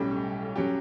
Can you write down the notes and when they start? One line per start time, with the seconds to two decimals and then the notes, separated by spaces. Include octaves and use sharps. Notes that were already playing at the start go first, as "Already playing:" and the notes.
Already playing: B1 A2 G3 C#4 G4
0.56 F#3 C#4 G4